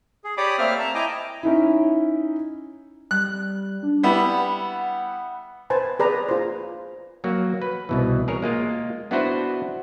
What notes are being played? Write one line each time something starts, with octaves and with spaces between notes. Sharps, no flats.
G#4
G4 C#5 D5 B5 D6 D#6
A3 A#3 C4 C5 E5 F6
A5 A#5
E4 D#5 G5 G#5 A#5 D6
C#4 D#4 E4
G3 F#6
D4
G3 B3 E4 F#5
B4 C5 G#5 A5
G#4 B4 D5 A#5
F4 C5
F#3 A#3 F#4
B4
C2 B2 E3
G#4 A#4 C#5
G#3 A#3 F4
B3 D4 E4 F#4 B4 C5